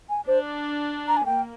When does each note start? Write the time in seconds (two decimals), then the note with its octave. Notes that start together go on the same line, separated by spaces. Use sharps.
0.09 G#5
0.26 D4 C5
1.08 A#5
1.17 G#5
1.26 A#3 G5